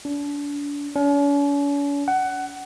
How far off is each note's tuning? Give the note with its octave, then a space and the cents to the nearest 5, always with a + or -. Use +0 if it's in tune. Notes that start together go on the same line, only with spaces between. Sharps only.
D4 -35
C#4 +45
F#5 +20